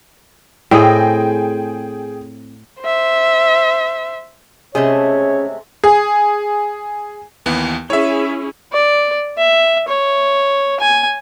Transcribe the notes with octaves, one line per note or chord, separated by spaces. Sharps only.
A2 C4 G#4 D#5 G5
C5 E5
C3 G#3 A3 C#4 G#4 C#5
G#4
D#2 E3 B3
C#4 E4 G#4 C#5 E5
D5
E5
C#5
G#5